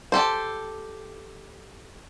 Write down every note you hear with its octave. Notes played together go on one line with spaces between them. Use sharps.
G4 A4 C5